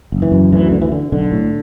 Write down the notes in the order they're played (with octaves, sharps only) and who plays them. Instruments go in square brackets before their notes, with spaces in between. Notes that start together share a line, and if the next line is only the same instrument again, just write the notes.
[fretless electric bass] F#1
E3
F#2
D2 E3
D3
E3
D3
B1 D3
A2